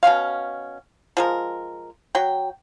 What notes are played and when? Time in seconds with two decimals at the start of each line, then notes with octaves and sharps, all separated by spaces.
0.03 B2 B3 C#4 F5
1.17 F3 G#3 A#4
2.15 F#3 G5